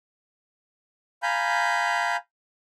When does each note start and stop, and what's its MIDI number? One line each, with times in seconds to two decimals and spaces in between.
1.23 2.16 77
1.23 2.16 80
1.23 2.16 82
1.23 2.16 83
1.23 2.16 91